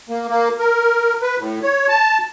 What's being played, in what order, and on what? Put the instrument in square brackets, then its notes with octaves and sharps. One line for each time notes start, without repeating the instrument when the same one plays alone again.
[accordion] A#3
A#3
A#4
B4
A2
C#5
A5